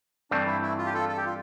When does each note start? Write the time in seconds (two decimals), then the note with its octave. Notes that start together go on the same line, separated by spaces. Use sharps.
0.31 G2 E3 A3 C4 D4
0.47 E4
0.62 E4
0.79 F4
0.86 G4
0.94 F4 A4
1.09 A4
1.17 G4
1.26 F4